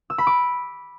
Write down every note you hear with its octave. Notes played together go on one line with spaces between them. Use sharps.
E6
B5
D6